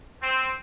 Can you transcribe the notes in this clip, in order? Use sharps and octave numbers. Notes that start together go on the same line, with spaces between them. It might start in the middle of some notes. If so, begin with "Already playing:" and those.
C4